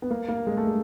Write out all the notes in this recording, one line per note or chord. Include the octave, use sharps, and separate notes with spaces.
B3
A#3
A#3
G#3
A3
G#3